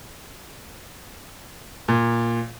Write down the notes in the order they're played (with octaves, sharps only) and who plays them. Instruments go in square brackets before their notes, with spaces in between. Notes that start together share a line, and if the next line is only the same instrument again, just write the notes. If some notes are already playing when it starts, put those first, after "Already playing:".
[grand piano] A#2